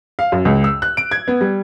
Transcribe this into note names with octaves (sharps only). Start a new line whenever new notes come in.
F5
F#2
C#2
E6
F#6
D7
G#6
B3
G3